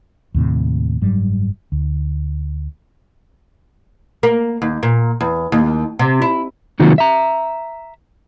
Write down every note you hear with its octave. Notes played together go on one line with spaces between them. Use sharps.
D#2 A2 C3
F#1 G#2 F#3 G3
D2
A#3
D#2
A#2
E2
D#2
C3
E4
C3 D#3 F#3 A#3 F4 F#4
E5 A#5